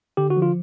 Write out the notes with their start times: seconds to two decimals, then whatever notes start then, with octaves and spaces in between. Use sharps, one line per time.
0.17 D3 G4
0.30 F#4
0.37 F3
0.42 F4